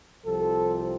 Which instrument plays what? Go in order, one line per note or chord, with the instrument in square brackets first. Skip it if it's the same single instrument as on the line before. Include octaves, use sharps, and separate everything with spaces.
[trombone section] C2 C3 F3 C4 A4